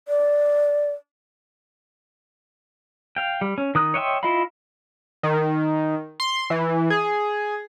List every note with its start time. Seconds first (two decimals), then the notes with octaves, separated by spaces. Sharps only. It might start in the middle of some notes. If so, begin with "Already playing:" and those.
0.08 D5
3.17 F5 G5
3.41 G3
3.58 C#4
3.75 D#3 D#6 F#6
3.94 C#5 D#5 E5 G5 C6
4.23 E4 F4 D#5 F5 B5
5.23 D#3
6.20 C6
6.50 E3
6.90 G#4